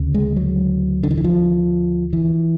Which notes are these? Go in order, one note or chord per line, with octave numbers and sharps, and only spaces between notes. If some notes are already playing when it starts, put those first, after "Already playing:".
Already playing: D2 C#3
G#3
F#3
D3
D#3
E3
F3
E3